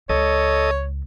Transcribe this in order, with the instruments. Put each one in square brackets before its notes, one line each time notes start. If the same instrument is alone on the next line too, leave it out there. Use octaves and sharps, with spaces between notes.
[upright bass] C#2 [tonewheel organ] A4 D#5 [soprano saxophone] C#5